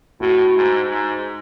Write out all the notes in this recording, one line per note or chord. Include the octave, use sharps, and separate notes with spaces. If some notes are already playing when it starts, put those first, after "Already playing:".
A2 F#4
G#2
G#2